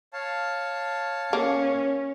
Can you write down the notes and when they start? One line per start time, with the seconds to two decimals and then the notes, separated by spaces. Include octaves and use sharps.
0.13 C#5 F5 A5
1.33 A#3 C#4